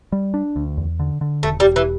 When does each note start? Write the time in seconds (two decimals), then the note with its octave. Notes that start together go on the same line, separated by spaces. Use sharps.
0.12 G3
0.34 D4
0.56 D2
0.78 E2
0.99 D3
1.21 D3
1.43 E1 A3
1.60 G3
1.65 E1
1.76 E3